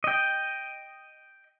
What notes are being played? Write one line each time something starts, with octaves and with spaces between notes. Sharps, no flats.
D#5 G5